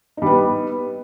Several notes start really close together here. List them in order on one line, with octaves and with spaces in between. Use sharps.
D#4 G3 B4 B3